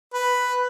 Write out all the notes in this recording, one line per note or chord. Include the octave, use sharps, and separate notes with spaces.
B4